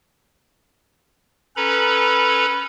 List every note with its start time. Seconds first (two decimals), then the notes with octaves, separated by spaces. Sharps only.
1.57 C#4 A4 B4 A#5 B5